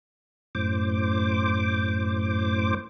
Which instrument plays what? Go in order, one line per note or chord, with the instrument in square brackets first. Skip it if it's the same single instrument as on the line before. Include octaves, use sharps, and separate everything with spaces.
[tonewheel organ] F#2 A2 C5 D6